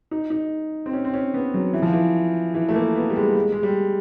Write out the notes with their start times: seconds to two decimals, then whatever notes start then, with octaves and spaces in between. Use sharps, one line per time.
0.11 D#4
0.30 D#4
0.86 C4
0.93 C#4
1.05 C4
1.14 C#4
1.34 B3
1.54 F#3
1.73 E3
1.82 F3
1.92 E3
2.54 E3
2.69 A3
2.75 A#3
2.96 B3
3.10 G3
3.16 G#3
3.35 G#3
3.52 G#3
3.63 G3